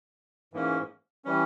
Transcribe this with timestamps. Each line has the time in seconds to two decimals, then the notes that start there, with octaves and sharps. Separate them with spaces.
0.54 G#2 E3 A#3 C#4
1.25 E3 G3 C#4